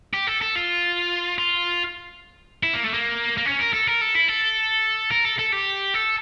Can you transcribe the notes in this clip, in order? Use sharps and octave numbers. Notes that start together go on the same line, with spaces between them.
G4
A4
A4
F4
F4
E4
A#3
A3
A#3
A#3
C#4
A#4
A4
A#4
A4
E4
A4
A#4
A4
A4
G4
A4